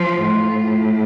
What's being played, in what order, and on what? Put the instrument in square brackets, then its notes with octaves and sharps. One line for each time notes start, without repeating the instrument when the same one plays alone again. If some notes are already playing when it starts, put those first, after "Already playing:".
Already playing: [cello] F3 [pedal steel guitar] F4
[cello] A2